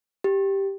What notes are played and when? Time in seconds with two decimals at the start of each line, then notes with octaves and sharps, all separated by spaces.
0.24 G4